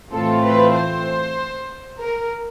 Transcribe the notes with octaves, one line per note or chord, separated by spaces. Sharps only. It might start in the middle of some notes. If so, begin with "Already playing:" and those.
A2 E3 A3 C4 F4 A4
B4
C5
A#4